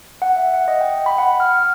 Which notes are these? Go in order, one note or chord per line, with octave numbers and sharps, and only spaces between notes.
F#5
E5
F#5
D#5
G5
B5
F#5
F6